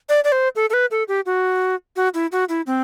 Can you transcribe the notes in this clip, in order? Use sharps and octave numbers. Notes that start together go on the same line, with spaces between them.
D5
D5
C5
A4
A4
B4
A4
G4
F#4
F#4
E4
F#4
E4
C4